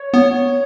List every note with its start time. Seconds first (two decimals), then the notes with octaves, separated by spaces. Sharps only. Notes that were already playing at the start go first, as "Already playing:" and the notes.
Already playing: C#5
0.14 B3